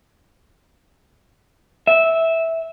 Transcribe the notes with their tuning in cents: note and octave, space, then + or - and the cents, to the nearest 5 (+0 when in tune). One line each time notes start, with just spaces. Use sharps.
E5 -10